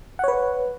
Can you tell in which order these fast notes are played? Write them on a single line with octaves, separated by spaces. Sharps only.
F#5 C#5 B4